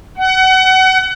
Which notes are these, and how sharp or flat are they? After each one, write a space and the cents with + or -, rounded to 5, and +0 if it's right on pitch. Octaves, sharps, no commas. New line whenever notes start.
F#5 +25